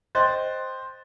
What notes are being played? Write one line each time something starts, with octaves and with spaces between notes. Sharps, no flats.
C5 D#5 G5 F#6 G6 A6